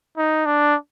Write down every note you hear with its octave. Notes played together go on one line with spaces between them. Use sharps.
D#4
D4